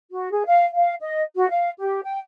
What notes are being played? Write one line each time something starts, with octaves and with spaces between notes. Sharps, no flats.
F#4
G#4
F5
F5
D#5
F#4
F5
G4
G5